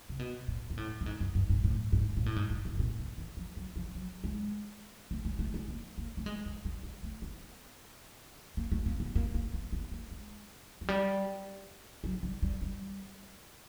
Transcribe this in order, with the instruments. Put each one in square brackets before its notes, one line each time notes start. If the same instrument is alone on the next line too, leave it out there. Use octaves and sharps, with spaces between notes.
[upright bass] C3
B2
A#2
A#2
A2
A2
G#2
G2
G2
G#2
A2
G#2
A#2
A2
G#2
G#2
A2
B2
A#2
A#2
E3
F3
F#3
F3
F#3
G#3
A3
G#3
A3
G#3
A#3
A#3
A3
G#3
G#3
G3
G#3
A3
B3
A#3
A3
A#3
B3
A#3
A#3
B3
B3
A#3
G#3
F#3
G3
F#3
G3
G3
G3